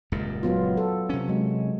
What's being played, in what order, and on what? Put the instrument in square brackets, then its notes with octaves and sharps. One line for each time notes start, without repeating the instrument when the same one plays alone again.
[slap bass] D#1 C#2 F#2
[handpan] F#3 B3 F4
A4
[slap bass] C3 C#4
[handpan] F#3 G#3